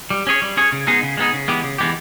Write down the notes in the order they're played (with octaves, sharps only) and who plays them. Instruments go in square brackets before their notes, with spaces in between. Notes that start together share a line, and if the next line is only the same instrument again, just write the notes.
[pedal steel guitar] G3
C#4 G#4 C#5
G3
C#4 G#4 C#5
C#3
G#3 B3 D#4 G#4
C#3
G#3 B3 D#4 G#4
C#3
E3 G#3 B3 G4
C#3
E3 G#3 B3 G4